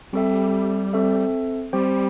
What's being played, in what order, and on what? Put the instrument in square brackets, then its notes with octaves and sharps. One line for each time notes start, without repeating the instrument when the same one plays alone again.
[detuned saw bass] G3 [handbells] C4 A4 E5
[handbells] C4 A4 E5
[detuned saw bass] G3 [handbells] C4 G4 C5 G5